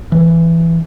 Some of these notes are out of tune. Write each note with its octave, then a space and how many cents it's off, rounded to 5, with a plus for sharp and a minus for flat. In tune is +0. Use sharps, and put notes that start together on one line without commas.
E3 +15